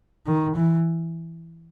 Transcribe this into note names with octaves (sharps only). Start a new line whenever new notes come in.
D#3
E3